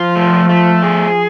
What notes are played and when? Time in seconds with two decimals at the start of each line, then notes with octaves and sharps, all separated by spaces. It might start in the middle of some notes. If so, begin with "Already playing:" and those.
Already playing: F3 F4
0.16 A3
0.49 A3
0.82 G#4